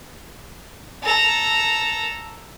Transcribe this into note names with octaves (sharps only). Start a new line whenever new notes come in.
A4 A#5